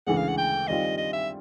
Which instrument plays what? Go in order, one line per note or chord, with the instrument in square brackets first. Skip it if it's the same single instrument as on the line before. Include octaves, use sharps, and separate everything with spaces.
[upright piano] D2 C#3 E3 G#3 [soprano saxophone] F#5
[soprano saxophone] F5
F#5
G5
[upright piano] D#3 G3 C4 F4 [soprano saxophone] D#5
[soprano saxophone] D#5
E5